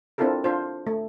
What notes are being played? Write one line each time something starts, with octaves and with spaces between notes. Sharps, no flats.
C4 D4 E4 F4 A4 A#4
D4 F4 C5
A3